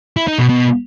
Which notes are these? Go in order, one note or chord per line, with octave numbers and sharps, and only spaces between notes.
E4
D#4
B2
B2